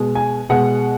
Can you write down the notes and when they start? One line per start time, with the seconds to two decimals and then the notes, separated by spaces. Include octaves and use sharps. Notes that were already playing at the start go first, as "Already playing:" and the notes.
Already playing: B2 G#3
0.15 G#5
0.49 B2 G#3 F#5